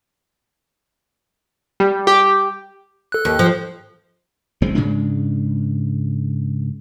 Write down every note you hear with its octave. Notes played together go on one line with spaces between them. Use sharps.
G3
G4
A4 F#6
D#2
F3
F#1 D#3 G#3 C4
G#2 C#3 G#3 D4